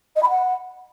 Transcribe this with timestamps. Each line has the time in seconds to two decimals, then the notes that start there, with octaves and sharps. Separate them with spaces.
0.16 D#5
0.22 B5
0.29 F#5